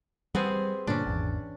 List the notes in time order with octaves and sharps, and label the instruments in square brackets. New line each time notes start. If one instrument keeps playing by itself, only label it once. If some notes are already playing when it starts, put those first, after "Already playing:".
[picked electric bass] G3 [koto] B3 C4 G#4
[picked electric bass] G2 A#2 D3 [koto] C#4 D4
[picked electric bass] G#1 E2